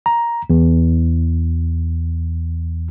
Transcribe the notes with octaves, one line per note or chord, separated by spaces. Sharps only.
A#5
E2